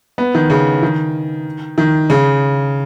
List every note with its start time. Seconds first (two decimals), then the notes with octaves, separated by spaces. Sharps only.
0.18 B3
0.35 D#3
0.50 C#3
0.83 D#3
1.78 D#3
2.10 C#3